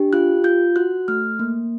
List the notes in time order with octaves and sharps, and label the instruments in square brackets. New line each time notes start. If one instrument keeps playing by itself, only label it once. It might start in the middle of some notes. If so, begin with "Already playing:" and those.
Already playing: [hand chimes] D4 G4
F4 F#6
F4 G6
F#4 F#6
A3 F6
A#3